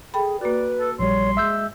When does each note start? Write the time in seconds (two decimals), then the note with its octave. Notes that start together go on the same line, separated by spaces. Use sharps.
0.14 G#4 A4 G5 B5
0.41 A#3 F#4 B4 D5
0.80 A4
0.99 A#1 G3 C#5 C6
1.37 G#3 E5 E6 G6